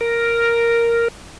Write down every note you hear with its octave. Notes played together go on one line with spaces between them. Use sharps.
A#4